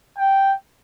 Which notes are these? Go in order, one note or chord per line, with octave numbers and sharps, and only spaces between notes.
G5